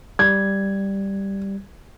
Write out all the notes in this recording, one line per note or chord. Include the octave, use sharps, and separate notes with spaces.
G3 G#6